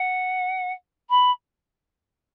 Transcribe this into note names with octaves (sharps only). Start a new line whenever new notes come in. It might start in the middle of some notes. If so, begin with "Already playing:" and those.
Already playing: F#5
B5